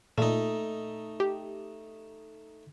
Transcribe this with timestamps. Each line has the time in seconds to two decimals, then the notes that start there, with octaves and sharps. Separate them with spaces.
0.18 A#2 A3 D#4
1.20 G4